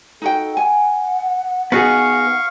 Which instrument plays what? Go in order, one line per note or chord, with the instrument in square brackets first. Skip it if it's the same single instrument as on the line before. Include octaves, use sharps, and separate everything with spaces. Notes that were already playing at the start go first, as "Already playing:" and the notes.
[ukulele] D#4 F#4 G5 [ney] A4
[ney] F#5 [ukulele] G#5
[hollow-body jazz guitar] B3 F#4 G#4 [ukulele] D#4 [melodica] F5 C#6